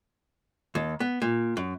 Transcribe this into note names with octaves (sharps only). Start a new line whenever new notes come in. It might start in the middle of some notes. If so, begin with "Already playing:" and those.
D#2
B3
A#2
F#2